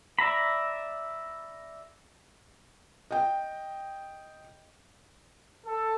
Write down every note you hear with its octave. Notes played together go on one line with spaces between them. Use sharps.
D5 E5 A#5 B5
D#5 G5
A4